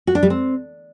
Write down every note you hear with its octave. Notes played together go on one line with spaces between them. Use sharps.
F#4
D4
G3
C4